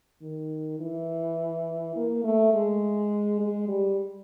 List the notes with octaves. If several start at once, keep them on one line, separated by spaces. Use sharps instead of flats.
D#3
E3
A#3
A3
G#3
G#3
G3